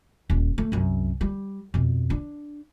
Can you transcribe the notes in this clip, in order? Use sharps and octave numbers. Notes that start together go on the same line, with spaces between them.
D#1
A3
C2 F#2
G3
F2 B2
D4